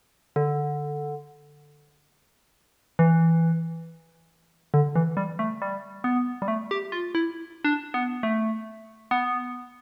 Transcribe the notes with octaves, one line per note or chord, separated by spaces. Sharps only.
D3
E3
D3
E3
G3
A3
G3
B3
G3
A3
G4
F4
E4
D4
B3
A3
B3